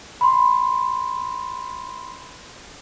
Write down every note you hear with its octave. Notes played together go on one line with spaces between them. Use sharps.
B5 C6